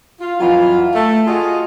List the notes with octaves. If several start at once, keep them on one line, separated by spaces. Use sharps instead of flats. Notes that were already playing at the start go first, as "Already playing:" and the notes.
F4
F2 E3 F#3 F4
A3
F4 F#4 G#4 D#5